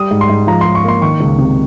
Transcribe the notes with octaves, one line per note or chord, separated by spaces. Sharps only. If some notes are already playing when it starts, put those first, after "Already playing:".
Already playing: G3 D#6
G#2
C6
G#2
F3 A#5
G#2 C6
C#6
A#3 C6
D#3 C#6
C#2
C3